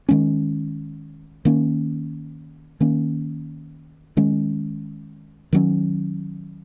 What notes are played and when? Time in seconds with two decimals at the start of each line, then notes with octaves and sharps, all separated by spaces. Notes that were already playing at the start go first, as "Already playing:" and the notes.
0.09 D#3 G#3 C#4
1.45 D#3 A#3 C#4
2.80 D#3 A#3 C#4
4.17 D#3 G#3 C#4
5.53 D#3 F#3 C#4